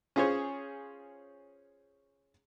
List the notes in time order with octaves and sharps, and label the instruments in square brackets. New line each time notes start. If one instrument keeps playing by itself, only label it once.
[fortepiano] C#4 F4 G#4 C5 C#5